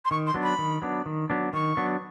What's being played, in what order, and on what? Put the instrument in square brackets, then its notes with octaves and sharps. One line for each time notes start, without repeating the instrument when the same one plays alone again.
[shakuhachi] C6
[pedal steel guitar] D#3 [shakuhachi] C#6
[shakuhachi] C6
[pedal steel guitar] F#3 B3 D4
[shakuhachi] B5
[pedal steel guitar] D#3
F#3 B3 D4
D#3
F#3 B3 D4
[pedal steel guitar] D#3 [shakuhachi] C#6
[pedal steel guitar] F#3 B3 D4